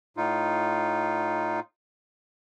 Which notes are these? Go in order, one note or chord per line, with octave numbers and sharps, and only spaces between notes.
A2 D#4 F4